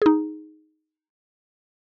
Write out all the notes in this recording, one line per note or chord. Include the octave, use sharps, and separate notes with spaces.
D#4 G#4